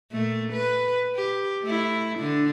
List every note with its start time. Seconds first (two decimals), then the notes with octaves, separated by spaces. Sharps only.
0.12 A#2 A3
0.52 B4
1.16 G4
1.63 A3 E4
2.18 D3 D4